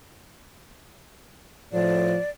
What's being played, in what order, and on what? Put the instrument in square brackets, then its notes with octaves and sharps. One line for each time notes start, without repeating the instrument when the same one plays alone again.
[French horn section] A2 F3 [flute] D5